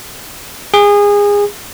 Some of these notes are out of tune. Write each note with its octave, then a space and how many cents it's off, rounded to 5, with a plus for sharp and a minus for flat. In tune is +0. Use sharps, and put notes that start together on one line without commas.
G#4 -25